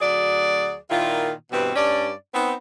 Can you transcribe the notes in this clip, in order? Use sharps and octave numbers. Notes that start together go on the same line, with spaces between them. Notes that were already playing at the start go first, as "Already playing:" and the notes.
D2 F#3 G#4 D5
A#2 D#3 E4 F4
G2 B2 E3 C4 F#4 B4
G2 C#4 D4 D5
B3 C4 D#4